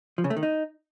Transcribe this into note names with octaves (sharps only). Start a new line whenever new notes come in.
F3
C#3
A3
D#3
D#4